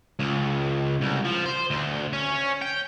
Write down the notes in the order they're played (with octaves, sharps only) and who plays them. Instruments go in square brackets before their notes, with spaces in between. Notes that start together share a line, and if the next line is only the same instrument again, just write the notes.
[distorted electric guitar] C#2
C2
F3
C5
D2
C#4
G5